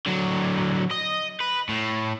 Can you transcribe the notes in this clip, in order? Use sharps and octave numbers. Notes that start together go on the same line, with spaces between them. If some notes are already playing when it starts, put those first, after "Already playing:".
D3 F#3
D#5
B4
A2